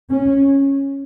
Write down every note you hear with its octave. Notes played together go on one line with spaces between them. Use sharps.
C#4